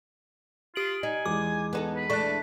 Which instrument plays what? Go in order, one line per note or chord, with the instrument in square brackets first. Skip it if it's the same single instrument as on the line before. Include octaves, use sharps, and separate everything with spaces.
[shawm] F4 [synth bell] G4 D7 F#7
[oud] D#4 [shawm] G#5
[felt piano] E2 G#3 [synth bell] D6
[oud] B3 D#4 A4
[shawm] B4
[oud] A3 D4 [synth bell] C#6 F#6